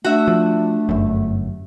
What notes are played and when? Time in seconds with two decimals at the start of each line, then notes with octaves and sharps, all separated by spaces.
0.04 A3 D4 F#4 E5
0.28 F3
0.89 G1 F#2